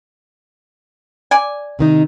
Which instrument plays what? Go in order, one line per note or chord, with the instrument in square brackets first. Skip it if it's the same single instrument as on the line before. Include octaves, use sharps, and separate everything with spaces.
[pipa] D5 G#5
[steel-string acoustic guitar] C3 D#3 D#4